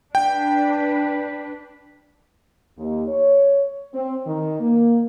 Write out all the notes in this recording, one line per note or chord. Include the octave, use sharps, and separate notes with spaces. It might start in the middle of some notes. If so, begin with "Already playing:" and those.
D4 B4 G5
D#2
C#5
C4
D#3
A#3